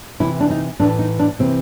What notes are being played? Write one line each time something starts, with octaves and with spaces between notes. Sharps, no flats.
C3 E3 E4
D4
D#4
A2 E3 D4
D#4
D4
C3 E3 C4